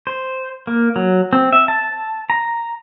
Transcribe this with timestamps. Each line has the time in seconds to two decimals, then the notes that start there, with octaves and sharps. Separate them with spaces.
0.07 C5
0.67 A#3
0.96 F#3
1.33 C4
1.53 E5
1.68 A5
2.30 A#5